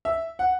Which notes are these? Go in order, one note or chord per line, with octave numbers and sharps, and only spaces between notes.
E5
F#5